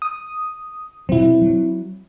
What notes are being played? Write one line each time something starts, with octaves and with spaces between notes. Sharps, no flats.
D#6
B2 F#3 C4 E4
F#3